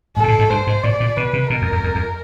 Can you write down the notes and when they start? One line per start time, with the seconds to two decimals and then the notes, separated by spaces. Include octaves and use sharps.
0.17 A2 A4
0.24 A#2
0.28 A2
0.39 G#2
0.50 G2 C5
0.67 G#2
0.83 A2 D5
1.00 A#2
1.17 B2 B4
1.33 C3
1.50 B2 A#4
1.62 F2
1.72 F2
1.83 F2
1.95 F2